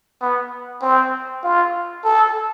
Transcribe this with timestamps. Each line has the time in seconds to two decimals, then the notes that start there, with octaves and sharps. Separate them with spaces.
0.21 B3
0.82 C4
1.43 F4
2.04 A4